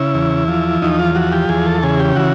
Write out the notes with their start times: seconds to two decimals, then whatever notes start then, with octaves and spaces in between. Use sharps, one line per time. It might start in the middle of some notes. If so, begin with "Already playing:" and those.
Already playing: C#3 E4
0.14 E2
0.48 F3
0.82 E2 D#4
0.99 F4
1.15 F3 F#4
1.32 G4
1.49 E2 G#4
1.66 A4
1.83 C#3 G#4
1.99 G4
2.16 E3 F#4